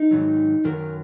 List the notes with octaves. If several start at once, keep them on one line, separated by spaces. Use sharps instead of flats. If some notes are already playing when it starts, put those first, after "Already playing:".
Already playing: D#4
G#2 D#3 F#3
F#2 D#3 F#3 A#4